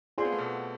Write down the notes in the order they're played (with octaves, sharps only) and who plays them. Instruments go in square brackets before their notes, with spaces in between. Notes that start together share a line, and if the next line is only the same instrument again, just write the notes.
[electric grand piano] C4 [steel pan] F4 G#4 D5 G#5 C6
[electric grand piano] B3
A3
B2 B3